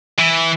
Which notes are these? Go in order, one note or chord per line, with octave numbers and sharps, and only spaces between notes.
E3